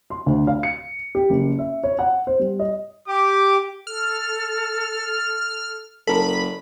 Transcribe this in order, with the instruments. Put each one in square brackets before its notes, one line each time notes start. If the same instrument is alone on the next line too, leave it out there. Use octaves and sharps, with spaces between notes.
[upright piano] C6
D2
F5
C#7
G4
F#1
E5
C#5
F#5
C5
G3
D#5
[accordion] G4 [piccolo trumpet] D6
[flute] A4 [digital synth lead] F6
[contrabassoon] F#1 [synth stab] A4 A#4 [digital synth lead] B5